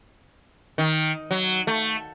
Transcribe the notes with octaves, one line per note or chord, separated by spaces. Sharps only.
D#3
F#3
A3